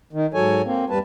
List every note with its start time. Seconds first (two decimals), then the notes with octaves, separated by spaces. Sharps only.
0.13 D#3
0.34 G#2 F#3 A4 C#5 G#5
0.65 A#3 C4
0.90 E2 G2 G3 B4 A5